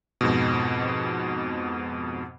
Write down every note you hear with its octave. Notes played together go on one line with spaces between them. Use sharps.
F2 G#2 B2